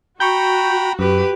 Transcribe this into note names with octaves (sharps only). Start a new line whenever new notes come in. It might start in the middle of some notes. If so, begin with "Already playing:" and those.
F#4 G5 A#5 B5 C#6 G6
F#2 G4 B4